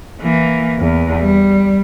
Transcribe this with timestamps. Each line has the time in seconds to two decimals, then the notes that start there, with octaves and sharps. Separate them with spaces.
0.21 E3 A#3
0.79 E2
1.19 G3